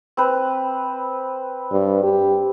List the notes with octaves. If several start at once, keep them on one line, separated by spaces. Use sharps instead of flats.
C4 B4
G2
G4